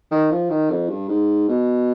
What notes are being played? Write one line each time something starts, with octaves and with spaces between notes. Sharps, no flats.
D#3
F3
D#3
F2
G2
G#2
B2